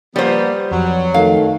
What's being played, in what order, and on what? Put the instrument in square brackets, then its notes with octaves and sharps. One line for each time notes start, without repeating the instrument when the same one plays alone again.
[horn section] F3 A#3 B3 [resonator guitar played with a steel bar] G3 C5
[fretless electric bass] F2 [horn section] F#3
[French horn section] D#3 A3 A4 [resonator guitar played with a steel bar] F5